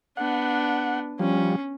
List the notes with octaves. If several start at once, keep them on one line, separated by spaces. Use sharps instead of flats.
B3 D4 F#5
F3 G3 C#4